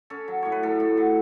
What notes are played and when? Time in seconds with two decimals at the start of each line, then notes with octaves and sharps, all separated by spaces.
0.10 C#4 A4
0.28 F#3
0.42 A2 C#5
0.52 B4
0.63 A2 A4
0.80 A2
0.97 F#3